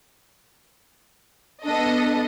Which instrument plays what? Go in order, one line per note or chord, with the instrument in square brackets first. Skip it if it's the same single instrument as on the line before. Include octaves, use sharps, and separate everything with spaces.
[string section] B3 A4 D#5 [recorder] D4